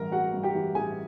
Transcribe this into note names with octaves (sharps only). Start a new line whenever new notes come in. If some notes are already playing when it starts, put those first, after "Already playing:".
Already playing: A1 G2 E3 A#4 A#5
G#3 F#4 F#5
G2
G4 G5
E3
A1 G#4 G#5